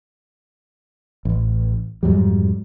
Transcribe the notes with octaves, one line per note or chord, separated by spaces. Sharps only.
A1
F2 G#2 F#3 G3